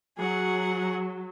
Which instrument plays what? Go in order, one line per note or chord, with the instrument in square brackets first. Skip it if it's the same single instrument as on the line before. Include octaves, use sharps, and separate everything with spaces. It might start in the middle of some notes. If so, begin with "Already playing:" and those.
[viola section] F#3 [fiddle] G#4 F#5